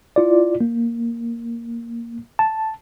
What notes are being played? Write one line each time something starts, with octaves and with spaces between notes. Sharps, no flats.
E4 F4 D5
A#3
A5